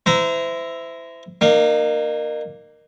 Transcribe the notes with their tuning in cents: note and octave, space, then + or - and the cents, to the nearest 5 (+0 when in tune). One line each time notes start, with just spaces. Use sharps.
E4 +0 C5 -35 A#5 +0
A#3 +0 D#4 -35